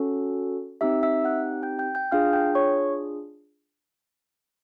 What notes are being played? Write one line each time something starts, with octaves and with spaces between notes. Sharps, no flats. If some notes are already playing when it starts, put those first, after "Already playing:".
Already playing: C#4 F#4 A4
C4 D#4 G4 E5 E6
E5 E6
F#5 F#6
G5 G6
G5 G6
G5 G6
D4 F4 G#4 F5 F6
G5 G6
C#5 C#6